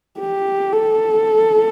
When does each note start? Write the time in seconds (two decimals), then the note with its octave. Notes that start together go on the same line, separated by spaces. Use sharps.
0.19 G4
0.72 A4